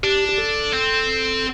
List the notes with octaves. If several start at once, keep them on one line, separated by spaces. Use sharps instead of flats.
D4 G4
G4
A4
C4